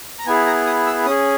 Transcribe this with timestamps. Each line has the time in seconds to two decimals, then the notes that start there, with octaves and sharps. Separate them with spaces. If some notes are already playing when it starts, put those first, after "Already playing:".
0.19 A#5
0.26 B3 E4 G#4 G#5
0.47 A#5
0.66 D#6
0.87 E6
1.06 C#4 G#4 D#6